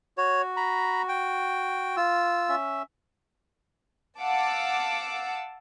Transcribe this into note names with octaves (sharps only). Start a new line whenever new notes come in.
F#4 C#5
A#5 B5
G5
F4 E6
C#4 E5
F5 F#5 A5 D6 E6